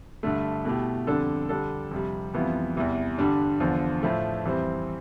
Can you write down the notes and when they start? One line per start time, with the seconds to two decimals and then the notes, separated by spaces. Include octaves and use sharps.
0.23 G2 D3 A3
0.65 B2 A3 E4 G4
1.07 F2 D3 G3 D4 A4
1.49 D3 G3 D4 A4
1.91 F2 C3 G3
2.34 F2 E3 G3 B3 F4
2.75 E2 C3 E3 G3
3.18 G2 D3 G3 D4
3.60 E2 D3 F3
4.03 A2 F3 A3
4.45 F2 E3 G3 C4